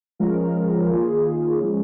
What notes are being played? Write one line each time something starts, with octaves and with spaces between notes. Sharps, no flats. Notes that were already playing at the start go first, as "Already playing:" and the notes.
F3 G#3 C#4 F4 A#4
D#3 A#3 F4 G#4
F3 G#3 C#4